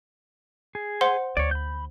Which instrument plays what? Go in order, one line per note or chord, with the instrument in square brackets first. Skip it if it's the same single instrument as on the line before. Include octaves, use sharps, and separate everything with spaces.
[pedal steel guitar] G#4
[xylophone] C5 F#5 C6
[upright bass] D2 [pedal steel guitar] C#5 D5
[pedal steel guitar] B5 G6